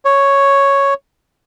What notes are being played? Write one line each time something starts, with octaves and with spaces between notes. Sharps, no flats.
C#5